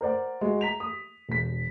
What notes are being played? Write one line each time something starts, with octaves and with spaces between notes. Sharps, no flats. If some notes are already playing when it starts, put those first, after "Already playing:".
A#4 C5 D5 F#5
G#3 F#4
A#5 B6 F7
D#6
E1 B6